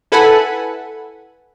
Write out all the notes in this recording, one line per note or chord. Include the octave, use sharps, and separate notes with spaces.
E4 A4 B4 F#5 G#5 B5